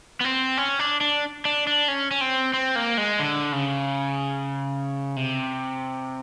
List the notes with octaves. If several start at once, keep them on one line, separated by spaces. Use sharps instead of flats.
B3
C4
C#4
D4
D4
D4
D4
C#4
C#4
C4
C4
A#3
G#3
D3
C#3
C3